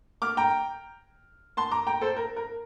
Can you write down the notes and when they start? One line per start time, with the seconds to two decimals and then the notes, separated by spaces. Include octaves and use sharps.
0.22 D6 F6
0.37 G5 A#5
1.57 A5 C6
1.71 A#5 D6
1.87 G5 A#5
2.01 A4 C5
2.17 A#4
2.36 A#4